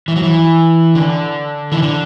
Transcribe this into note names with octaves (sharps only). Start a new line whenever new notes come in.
E3
F#3
E3
D3
E3
D3